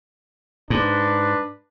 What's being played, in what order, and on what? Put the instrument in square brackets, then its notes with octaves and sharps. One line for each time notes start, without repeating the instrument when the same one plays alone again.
[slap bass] G#2 [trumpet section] D4 B4